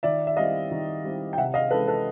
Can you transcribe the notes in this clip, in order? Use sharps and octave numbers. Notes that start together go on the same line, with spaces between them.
D#3 D5 E5
E5
G3 C4 E4 D#5 F5
D#3
G3 C4 E4
G5
C3 E5 F#5
D#5 F5
E3 G#3 C#4 A4 B4
A4 B4